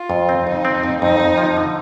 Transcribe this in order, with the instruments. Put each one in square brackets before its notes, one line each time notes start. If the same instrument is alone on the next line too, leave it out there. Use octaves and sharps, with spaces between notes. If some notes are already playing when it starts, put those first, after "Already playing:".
Already playing: [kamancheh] F4
[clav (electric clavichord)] F2
C4
[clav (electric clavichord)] F2 [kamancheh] D#4
[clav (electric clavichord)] C4
F2
[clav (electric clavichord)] F2 [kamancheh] D#4
[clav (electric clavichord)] F2
F3
D3